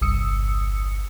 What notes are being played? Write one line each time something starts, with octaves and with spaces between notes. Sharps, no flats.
G1 C2 G2 D#6 E6 C#7